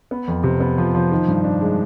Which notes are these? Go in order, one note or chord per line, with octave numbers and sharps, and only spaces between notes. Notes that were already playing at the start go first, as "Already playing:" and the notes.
B3
F2
C3
B3
F3
F3
D#3
G2
D4
G#3